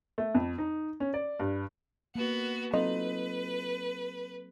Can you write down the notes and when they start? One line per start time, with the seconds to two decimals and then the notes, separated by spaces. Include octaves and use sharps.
0.18 A3
0.34 F2
0.58 D#4
1.00 C#4
1.14 D5
1.40 G2
2.15 A#3 B3 F#4
2.73 F#3 C4 D#4 F4 A4 B4 D#5